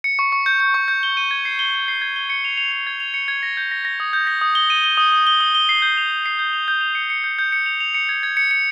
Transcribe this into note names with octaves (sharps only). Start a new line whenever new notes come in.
C#7
C#6
C#6
G6
G6
C#6
G6
G7
D#7
G#6
C7
G7
G7
C7
G#6
G7
C#7
F7
F7
F7
G#6
F7
C#7
G#6
A#6
G6
A#6
A#6
D#6
G6
A#6
D#6
G7
D#7
G7
D#6
D#6
G7
D#6
G7
C7
G6
F7
G6
C7
G6
F7
G6
F7
C#7
C#7
G6
G6
C#7
F7
F7
C#7
G#6
G#6
C#7
C#7